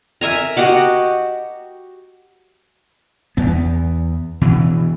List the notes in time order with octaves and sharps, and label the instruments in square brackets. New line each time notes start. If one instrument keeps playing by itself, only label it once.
[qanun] A#4 E5 G#5 A#5
F#4 G4 D#5 F#5
[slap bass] E2 B3
B2 E3